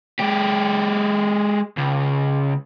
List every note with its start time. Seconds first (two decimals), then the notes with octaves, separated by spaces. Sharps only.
0.20 G#3 G4
1.77 C#2